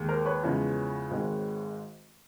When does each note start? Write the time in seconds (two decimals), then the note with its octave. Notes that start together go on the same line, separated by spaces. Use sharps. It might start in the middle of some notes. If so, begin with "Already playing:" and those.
Already playing: D#2 D#3 G#3
0.09 A#4 C5
0.26 B4 C#5
0.43 E2 C#3 F3 G#3
1.10 G#1 G#2 D#3 G#3